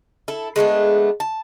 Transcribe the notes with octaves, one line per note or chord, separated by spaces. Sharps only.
E4 A4
G#3 A3 B3 D4
A5